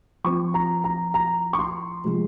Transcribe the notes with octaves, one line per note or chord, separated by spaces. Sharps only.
F3 C4 C#6
A#5
A#5
A#5
C#6
C6
C3 F3 G#3 C4